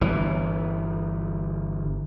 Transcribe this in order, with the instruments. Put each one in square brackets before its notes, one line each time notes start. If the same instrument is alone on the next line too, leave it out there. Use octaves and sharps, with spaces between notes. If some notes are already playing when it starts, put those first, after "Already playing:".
[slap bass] G1 E3